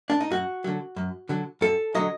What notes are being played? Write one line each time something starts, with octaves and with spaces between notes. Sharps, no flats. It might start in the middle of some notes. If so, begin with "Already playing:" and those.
D4
D#4
F#2 F#4
D3 F#3
F#2
D3 F#3
F#2 A4
D3 F#3 D#5